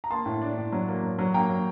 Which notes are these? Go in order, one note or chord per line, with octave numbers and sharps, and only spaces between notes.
A#5
A#3 A5 C6
A2
D4
A2
F#3
A#3
F#3
F#3
A#3 G5 A#5
F#3